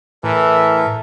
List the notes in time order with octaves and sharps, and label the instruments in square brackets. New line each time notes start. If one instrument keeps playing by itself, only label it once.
[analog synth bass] A2 [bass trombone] E3 [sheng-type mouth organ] A4 A#4 E5